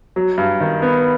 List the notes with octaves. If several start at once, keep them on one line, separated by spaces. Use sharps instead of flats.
F#3
G2
D#3
B3